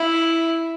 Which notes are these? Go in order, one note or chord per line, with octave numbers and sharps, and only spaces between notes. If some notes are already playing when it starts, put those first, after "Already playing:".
Already playing: E4